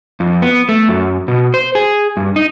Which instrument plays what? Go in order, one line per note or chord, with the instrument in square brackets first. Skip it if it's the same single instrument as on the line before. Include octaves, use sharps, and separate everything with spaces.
[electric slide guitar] F2
B3
A3
F#2
B2
C5
G#4
G2
D#4